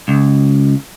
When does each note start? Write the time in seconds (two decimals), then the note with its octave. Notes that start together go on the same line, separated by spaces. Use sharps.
0.08 C#2